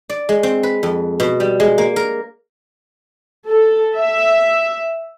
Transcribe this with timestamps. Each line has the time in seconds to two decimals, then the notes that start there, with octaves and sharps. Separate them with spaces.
0.10 D5
0.29 G#3
0.43 C4
0.63 B4
0.83 F2
1.20 B2
1.40 G3
1.60 G#3
1.78 A#3
1.96 A#4
3.49 A4
3.97 E5